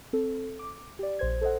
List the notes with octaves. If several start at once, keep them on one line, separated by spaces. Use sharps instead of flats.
C4 A4
D6
G4 D5
A#1 C5 G#6
A4 C5 D#5 F#5